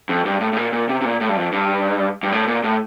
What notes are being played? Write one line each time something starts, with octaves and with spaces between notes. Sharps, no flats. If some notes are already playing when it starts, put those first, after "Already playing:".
F2
G2
A2
A2
A#2
A#2
C3
C3
A#2
A2
G2
F2
G2
G2
A2
A#2
A2